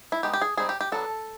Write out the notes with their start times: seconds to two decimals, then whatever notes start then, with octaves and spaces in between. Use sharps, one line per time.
0.12 E4
0.23 G#3 B3 D#4 G4
0.34 G4
0.41 G#4
0.57 G3 C4 D#4 G#4
0.69 G4
0.81 G4
0.92 F#3 B3 D4 A4